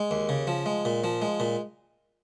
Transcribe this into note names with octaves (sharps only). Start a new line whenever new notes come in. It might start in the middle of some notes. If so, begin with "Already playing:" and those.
Already playing: G#3
D#2
C#3
F3
G#3
A#2
F3
G#3
A#2